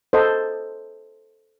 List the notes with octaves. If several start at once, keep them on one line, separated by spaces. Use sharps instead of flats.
A4 C5 D#5